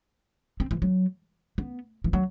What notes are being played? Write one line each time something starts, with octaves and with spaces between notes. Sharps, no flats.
C4
E3
F#3
B3
E3
F#3